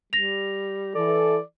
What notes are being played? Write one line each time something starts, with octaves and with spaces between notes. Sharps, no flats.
G3 A#6 F7
E3 A4 D5